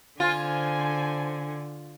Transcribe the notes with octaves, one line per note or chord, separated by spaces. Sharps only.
D3 F4 C5 G#5